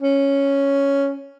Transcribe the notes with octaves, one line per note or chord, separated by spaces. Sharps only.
C#4